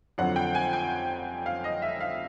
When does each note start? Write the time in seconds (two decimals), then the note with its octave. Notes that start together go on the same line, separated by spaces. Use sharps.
0.18 F2 D3 F#3 F#5
0.36 G5
0.55 G#5
0.73 G5
1.46 F5
1.64 D#5
1.82 E5
2.00 F5